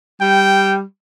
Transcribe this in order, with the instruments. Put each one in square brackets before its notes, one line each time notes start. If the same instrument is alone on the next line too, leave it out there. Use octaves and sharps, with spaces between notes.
[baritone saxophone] G3 [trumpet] G5